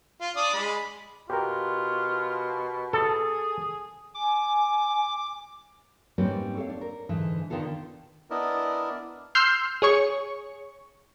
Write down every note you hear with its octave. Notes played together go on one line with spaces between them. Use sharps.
F4
D4 D5 D#6
G#3 B5
B2 F4 G4 A#4
G#4 A4
G#5 D6
G#2 G3 A#3 C4 C#4 B4
A4 C#5 F5
D4
A#4
G#2 D3 E3
D3 D#3 B3 F4 A4
B3 D4 E4 A#4 D5 D#5
C6 E6 F6 G6 C7
G#4 C#5 C#6